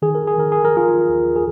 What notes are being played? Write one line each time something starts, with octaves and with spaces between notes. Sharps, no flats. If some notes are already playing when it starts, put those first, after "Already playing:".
D#3 G#4
A#4
G#4
D#3 A#4
G#4
A#4
D#3 F4 G#4
D#2
G#4